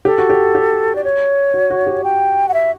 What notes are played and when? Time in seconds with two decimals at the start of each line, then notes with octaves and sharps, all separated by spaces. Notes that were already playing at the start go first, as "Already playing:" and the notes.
0.05 G4 A4
0.18 F#4
0.30 G4
0.55 G4
0.95 D5
1.04 C#5
1.54 F#4
1.70 F#4
1.87 G4
2.04 G5
2.48 F#5
2.54 E5